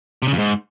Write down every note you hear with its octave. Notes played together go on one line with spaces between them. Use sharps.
C3
C#3
F2
G#2